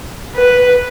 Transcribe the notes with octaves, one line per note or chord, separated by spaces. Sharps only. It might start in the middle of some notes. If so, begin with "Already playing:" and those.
B4